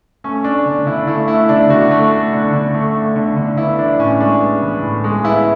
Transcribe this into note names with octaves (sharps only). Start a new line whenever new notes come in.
A3 C#4
A3 D4
D3
D3 E4
A3 E4
A3 E4
D3 D4
D3 F#4
A3
A3
D3
D3
A3
A3
D3
D3
B3 E4
E3 D4
A2 C#4
G#3 D4
B3
E3
A2
G#3
B3 E4